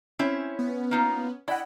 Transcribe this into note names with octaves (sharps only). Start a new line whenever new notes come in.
C4 C#4 E4 E5
B3
A#3 D#4 F4
E4 D5 D#5 F#5 G5 B5